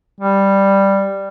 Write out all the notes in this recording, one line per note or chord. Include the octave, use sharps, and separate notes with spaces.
G3